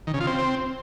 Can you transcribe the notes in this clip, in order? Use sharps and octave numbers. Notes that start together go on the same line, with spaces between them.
D#3
C#3
F4
C4